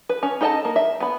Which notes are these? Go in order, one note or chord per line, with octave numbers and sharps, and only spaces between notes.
B4
C#4
D#4 A4 D#5 G5 A5
A#3
E5
B3 B5